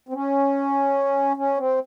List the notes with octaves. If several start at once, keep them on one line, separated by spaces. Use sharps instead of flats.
C4
C#4
C#4
C4